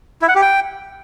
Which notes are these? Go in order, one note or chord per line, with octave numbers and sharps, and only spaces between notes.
E4
F#5
G4
G5